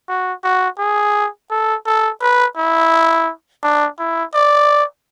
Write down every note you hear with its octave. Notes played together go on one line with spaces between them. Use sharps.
F#4
F#4
G#4
A4
A4
B4
E4
D4
E4
D5